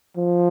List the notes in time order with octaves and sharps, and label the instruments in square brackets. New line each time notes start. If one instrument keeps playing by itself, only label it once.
[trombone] F3